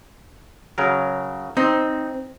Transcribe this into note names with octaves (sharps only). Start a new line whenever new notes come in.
C#3 F#3 A#4
C4 D#4